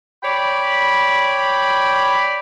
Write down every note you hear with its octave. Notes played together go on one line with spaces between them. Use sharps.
C#5 D5 G5 B5